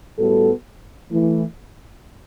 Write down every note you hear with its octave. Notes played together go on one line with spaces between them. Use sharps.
A2 G3 B3 F#4 A4
E3 A3 E4